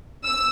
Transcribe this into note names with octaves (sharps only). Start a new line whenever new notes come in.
E6